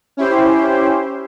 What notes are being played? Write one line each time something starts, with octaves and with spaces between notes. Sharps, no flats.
C#4 E4 G4 C5